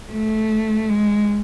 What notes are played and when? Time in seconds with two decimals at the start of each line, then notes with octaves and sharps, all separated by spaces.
0.11 A3
0.89 G#3